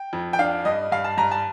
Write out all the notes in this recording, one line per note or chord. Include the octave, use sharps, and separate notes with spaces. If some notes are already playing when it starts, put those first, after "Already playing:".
Already playing: G5
F2
G5
D4 F5
G2 D#5
G2 F5
A5
G2 A#5
A5